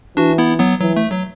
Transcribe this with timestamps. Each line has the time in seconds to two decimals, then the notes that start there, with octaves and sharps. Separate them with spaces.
0.17 E3 D4 F#4
0.38 B3 E4
0.59 F#3 B3
0.81 E3 F#3
0.97 A3
1.12 F#3